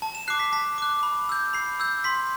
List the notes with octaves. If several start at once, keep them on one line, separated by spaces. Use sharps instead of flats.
A5
E7
D6 F#6 C7
B6
A5 B6
D6 F#6
B5
E6 G6
B5 C7
E6 G6
C6 B6